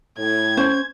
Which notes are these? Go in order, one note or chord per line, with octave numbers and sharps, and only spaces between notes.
A2 G#6
C#4 C5